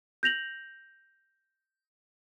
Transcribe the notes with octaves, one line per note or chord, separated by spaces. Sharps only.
G6 A#6 F7 F#7